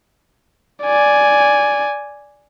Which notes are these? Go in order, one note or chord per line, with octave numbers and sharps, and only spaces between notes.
D5 G#5